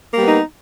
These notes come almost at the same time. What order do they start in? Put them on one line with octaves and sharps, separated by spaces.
A#3 G3 B3 D#4